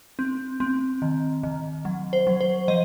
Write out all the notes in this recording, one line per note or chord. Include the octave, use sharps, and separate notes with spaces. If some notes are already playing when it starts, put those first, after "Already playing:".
C4
C4
D#3
D#3
F#3
C5
F#3
C5
F3 D#5